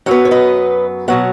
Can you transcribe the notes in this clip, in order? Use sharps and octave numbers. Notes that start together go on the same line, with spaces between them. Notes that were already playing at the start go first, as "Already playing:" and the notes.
F#2 F#3 B3 C#5 F#5
C#5
B4 D#5
B2 F#3 B3 C#5 F#5